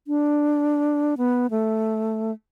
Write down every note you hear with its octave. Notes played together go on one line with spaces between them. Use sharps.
D4
B3
A3